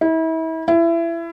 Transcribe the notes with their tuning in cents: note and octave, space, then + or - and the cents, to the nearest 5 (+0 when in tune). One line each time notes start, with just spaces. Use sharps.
E4 -35
E4 +25